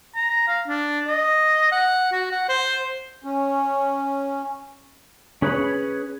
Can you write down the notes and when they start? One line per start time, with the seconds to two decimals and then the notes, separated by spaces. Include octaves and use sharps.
0.16 A#5
0.48 F5
0.68 D4
1.07 D#5
1.72 F#5
2.12 F#4
2.31 F#5
2.48 C5
3.24 C#4
5.42 C#4 G#4 B4 C#5 B5